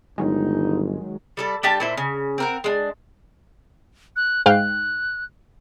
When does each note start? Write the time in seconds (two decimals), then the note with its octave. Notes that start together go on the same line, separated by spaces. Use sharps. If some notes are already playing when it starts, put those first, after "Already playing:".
0.18 G1 D#3 F#3 G#3 D#4
1.37 G3 A4 D5
1.63 G3 D4 G4 A5
1.80 A#2 E4 C5
1.97 C#3
2.38 C4 A#4 F#5
2.64 G#3 D4
4.16 F#6
4.46 G#2 F5 G5 F#6